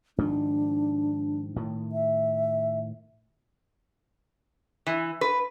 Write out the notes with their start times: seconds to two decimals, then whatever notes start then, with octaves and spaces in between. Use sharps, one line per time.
0.18 G#2 D#3 F3 D4
1.56 A2 D#3
1.92 E5
4.87 E3
5.21 B4